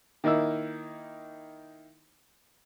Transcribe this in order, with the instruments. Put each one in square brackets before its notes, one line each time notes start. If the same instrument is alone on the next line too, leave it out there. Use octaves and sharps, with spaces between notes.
[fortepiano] D#3 A#3 D#4 E4 E6